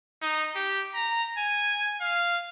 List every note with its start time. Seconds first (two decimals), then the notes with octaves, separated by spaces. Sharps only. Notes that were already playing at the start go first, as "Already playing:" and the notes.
0.22 D#4
0.55 G4
0.95 A#5
1.38 G#5
2.01 F5